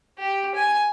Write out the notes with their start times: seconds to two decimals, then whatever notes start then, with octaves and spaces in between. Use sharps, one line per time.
0.18 G4
0.55 G#5